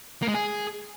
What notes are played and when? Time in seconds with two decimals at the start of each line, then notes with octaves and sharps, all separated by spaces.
0.22 A#3
0.28 G#3
0.34 G#4